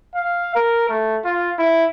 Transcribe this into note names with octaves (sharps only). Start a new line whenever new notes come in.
F5
A#4
A3
F4
E4